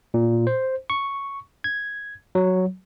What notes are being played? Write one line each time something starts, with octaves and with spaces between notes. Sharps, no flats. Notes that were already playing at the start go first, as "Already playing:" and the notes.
A#2
C5
C#6
G#6
F#3